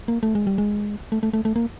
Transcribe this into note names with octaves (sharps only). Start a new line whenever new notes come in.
A#3
A3
G#3
G3
G#3
A3
A3
A3
A3
A#3